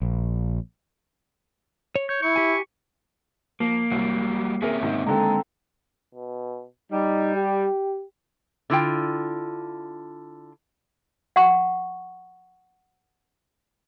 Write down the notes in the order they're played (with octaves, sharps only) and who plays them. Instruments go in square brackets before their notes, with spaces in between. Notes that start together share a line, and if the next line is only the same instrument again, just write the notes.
[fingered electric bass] A#1
[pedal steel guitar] C#5
[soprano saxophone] C#5 [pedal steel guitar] G6
[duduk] E4 [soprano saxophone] C#6
[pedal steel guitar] G4 G#5
[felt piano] F3 [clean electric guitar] A#3
[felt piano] C2 [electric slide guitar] F#3 G3
[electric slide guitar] C4 C#4 E5 [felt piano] G#4 A#4
[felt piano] G#2 D#3
[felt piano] D3 D#3 [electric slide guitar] G#3 [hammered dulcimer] C4 A4 A#5
[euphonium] B2
[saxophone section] G3 [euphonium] D#4
[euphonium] G4
[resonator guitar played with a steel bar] D3 E4 F4 G5
[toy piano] F#5 C#6